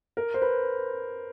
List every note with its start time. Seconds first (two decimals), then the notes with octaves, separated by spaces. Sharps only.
0.17 A#4
0.34 C5
0.42 B4